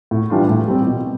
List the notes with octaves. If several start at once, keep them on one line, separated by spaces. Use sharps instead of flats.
A2
E3 G3 D4 F4
A2
G3 C4
B2